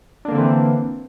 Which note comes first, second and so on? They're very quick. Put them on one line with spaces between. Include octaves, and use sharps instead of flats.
D4 A#3 D3 C4 E3